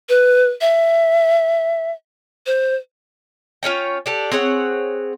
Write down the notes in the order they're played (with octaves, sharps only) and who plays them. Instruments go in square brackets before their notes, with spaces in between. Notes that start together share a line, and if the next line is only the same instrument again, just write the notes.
[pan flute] B4
E5
C5
[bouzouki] C#4 F4 C#5 G5
D4 G4 A4
C4 G#4 C#5 F#5